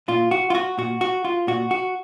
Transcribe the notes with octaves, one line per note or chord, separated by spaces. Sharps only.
A#2 F4
F#4
F4
F#4
A#2 F#4
F#4
F4
A#2 F#4
F#4